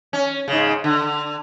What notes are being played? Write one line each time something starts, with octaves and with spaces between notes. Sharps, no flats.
C#4
G#2 C#3
D3